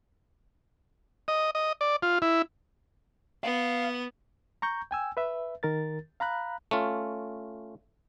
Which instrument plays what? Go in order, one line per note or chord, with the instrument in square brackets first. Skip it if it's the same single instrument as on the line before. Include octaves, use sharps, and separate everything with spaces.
[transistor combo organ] D#5
D#5
D5
F4
E4
[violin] B3 [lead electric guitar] F5
[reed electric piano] A#5 C#6 G6
G5 G#5 E6
B4 E5
D#3 A#4 A6
F5 A#5 B5 F#6
[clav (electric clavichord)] A3 C#4 F4